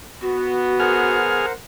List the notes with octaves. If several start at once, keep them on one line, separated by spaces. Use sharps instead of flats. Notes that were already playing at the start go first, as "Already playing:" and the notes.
B3 F#4
G#4 A#4 C5 F#5 F6